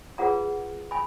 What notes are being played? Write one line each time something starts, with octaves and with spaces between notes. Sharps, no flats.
F4 G#4 B4 F#5 A#5
G#5 B5